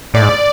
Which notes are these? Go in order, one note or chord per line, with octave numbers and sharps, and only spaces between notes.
A2 D5
G#2